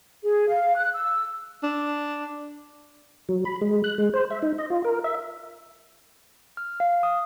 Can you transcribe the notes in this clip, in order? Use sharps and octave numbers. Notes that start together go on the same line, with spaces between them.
G#4
F5
F#6
E6
D4
F#3
B5
G#3
F#6
G#3
C5
E5
D#4
D#5
F4
A#4
E5
F6
F5
D#6